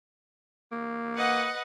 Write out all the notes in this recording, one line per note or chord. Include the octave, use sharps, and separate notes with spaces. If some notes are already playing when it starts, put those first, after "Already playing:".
A#3
B4 D#5 F#5